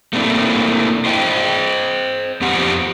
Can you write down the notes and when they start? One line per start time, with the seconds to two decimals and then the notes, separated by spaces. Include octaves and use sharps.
0.13 A3 A#3 C4 D4 E4
1.05 C5 D#5 G5
2.41 F2 B3 G4 F#5